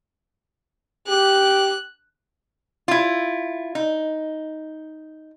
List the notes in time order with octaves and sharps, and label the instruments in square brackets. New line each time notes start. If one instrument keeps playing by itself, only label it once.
[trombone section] G4 [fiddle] F#6
[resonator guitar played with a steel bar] E4 F4
D#4